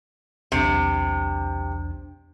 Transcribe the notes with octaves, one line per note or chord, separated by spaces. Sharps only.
B1 E2 C3 D4